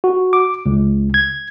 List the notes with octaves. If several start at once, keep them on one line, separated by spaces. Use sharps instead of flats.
F#4
D6
C#2
G#6